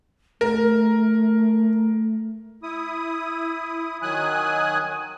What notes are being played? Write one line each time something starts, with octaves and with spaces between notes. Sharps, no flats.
A3 A#4
E4 D#6
D#3 F#3 G#5 D#6 F#6